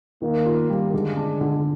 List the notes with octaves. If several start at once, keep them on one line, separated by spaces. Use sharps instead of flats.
D#3 A#3
F4
G3
D3 G#3
D4
D3